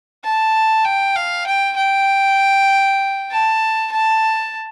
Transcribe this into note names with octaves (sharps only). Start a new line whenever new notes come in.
A5
G5
F5
G5
G5
A5
A5